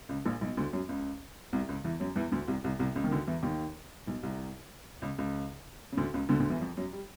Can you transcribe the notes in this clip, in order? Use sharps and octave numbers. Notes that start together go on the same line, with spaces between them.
C#2 C#3
A#1 A#2
B1 B2
D2 D3
F#2 F#3
C#2 C#3
C2 C3
C#2 C#3
E2 E3
F#2 F#3
E2 E3
D2 D3
C2 C3
C2 C3
C2 C3
C#2 C#3
D#3
D2 D3
E2 E3
D#2 D#3
B1 B2
C2 C3
C#2 C#3
C#2 C#3
C#3
D2 D3
C#2 C#3
D2 D3
D2 D3
E2 E3
F2 F3
F#2 F#3
G3